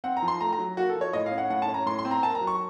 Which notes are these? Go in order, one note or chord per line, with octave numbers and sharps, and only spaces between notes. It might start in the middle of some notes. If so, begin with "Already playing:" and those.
C4 F#5
A#5
F3
C6
A3 A#5
A#5
F#3
A#3 F#4
A4
F3
C#5
A2 D#5
F5
C#4
F#5
A2 F#5
A5
C#4
A#5
A2 C6
C6
C4
A#5
A#3 A5
A#5
F#3
C#6